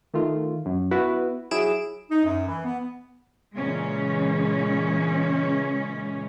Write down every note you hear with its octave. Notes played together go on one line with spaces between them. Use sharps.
D#3 A3 F4
F#2
B3 E4 F#4 B4
F#3 E4 G#4 D7 E7
D#4
F#2
E3
B3
A#2 C#3 E3 G#3 C#4